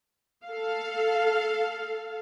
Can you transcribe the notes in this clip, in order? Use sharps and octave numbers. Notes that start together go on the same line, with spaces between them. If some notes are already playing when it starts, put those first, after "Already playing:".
A4 F5